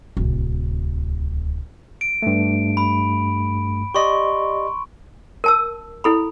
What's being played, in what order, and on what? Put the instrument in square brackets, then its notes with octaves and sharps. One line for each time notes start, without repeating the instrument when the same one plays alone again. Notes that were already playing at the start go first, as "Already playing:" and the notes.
[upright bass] D1 C2
[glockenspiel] D7
[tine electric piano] G2 A3
[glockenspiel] B5
[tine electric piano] G4 D5 D#5 [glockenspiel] C6 C#6
[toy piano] A#4 A5 E6
E4 A4 B5